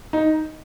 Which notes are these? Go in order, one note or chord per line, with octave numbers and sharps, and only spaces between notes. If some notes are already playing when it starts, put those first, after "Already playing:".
D#4